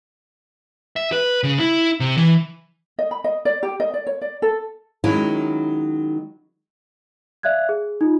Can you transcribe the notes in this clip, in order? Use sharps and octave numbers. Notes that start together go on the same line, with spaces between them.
E5
B4
C#3
E4
C3
E3
D#5
B5
D#5
D5
G4
D#5
D5
C#5
D5
A4
D#3 F#3 G#3 C#4 D#4 E4
D5 E5 F5 F#6 G#6
G#4
D#4 F4